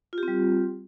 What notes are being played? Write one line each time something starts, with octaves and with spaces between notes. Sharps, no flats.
G3 C4 F4 G4